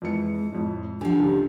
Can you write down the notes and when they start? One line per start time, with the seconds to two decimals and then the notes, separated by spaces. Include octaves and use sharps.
0.02 F2 E3 G#3 C#7
0.52 F2 A2
1.01 D3 F3 D4 G4 G#5
1.20 C#2 G4